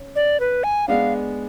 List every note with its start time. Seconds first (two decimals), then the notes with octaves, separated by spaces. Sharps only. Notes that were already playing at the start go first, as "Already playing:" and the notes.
Already playing: C#4
0.16 D5
0.40 B4
0.64 G#5
0.88 G#3 B3 D4 F5